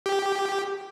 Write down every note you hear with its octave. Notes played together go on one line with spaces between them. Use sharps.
G4